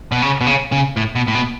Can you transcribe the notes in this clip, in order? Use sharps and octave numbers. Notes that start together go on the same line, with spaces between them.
B2
C#3
B2
C#3
C#3
A2
B2
A2
B2